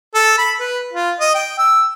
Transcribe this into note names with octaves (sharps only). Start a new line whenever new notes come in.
A4
B5
B4
F4
D#5
G5
E6